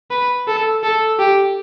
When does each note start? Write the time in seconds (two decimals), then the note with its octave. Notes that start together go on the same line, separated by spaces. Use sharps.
0.11 B4
0.47 A4
0.83 A4
1.19 G4